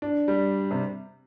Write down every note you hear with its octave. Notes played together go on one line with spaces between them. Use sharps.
D4
G3
C3